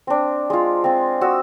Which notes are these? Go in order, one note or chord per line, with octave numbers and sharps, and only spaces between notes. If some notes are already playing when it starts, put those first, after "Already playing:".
C4 D4
G#3 F4
C4 F4
F#4 D#6 E6